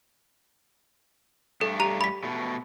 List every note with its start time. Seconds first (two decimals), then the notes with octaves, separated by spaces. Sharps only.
1.61 G2 A3 D4 A4
1.80 G4 A#5 F7
2.01 B5 B6
2.24 B2 A3